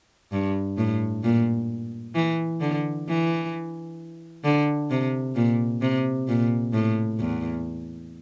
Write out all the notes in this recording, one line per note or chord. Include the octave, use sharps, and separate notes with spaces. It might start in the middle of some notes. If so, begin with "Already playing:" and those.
G2
A2
A#2
E3
D3
E3
D3
C3
A#2
C3
A#2
A2
E2